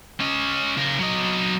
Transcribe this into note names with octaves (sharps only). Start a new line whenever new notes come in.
C#4 D#5
C#3 A#4
F#3 D#5